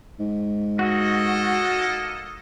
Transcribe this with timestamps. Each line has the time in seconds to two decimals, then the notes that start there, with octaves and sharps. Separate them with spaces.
0.20 G#2
0.79 A#3 F#4 A4 D#5